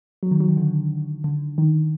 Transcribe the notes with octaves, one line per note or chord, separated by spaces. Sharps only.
F#3
D#3
F#3
D#3
D3
D3
D#3